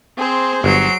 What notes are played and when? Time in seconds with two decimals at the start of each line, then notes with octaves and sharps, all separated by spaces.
0.18 C4 G#4 C5
0.64 G1 F#3 C7 D7